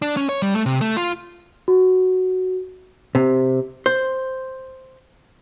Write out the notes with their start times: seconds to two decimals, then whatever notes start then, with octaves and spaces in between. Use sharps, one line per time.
0.02 D4
0.17 C#4
0.29 C#5
0.42 G3
0.54 A3
0.66 C3
0.81 A3
0.97 F4
1.68 F#4
3.15 C3
3.86 C5